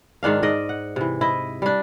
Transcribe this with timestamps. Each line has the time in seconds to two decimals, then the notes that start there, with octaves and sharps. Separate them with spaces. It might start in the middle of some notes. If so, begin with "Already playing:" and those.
0.23 G#2 D#3 D4 F5
0.42 G#2 D5 D#5
0.69 F#5
0.96 C3 E3
1.21 E4 D#5
1.62 G3 D4